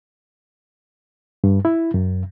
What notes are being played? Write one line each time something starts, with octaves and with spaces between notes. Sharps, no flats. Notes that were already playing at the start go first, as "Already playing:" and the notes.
G2
E4
F#2